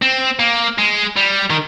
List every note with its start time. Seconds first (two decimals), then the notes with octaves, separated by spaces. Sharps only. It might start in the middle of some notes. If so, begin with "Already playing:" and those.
0.02 C4
0.39 A#3
0.78 G#3
1.16 G3
1.50 D#3